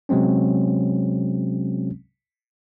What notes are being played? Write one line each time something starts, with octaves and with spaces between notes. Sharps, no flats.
C3 F#3 G#3 C4 C#4